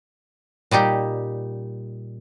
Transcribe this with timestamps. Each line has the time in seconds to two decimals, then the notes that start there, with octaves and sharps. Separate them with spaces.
0.71 A#2 G3 D#4 G4